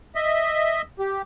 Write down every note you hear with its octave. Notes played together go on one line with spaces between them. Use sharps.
D#5 E5
G4